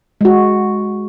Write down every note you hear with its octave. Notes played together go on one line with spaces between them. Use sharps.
G#3 F#4